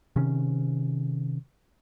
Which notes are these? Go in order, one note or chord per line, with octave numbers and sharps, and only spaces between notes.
C3 D#3 C#4